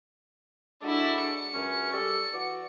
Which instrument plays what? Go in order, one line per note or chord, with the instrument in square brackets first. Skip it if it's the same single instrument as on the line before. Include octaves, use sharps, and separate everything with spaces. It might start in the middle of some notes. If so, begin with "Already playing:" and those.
[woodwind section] G#3 F#4 A4 [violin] D4 E4
[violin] C#7
[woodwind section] C#2 F#2 C#4
G3 G4 A4
E3 F#4 D5